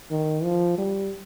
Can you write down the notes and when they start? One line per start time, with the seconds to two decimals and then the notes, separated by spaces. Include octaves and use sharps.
0.11 D#3
0.43 F3
0.78 G3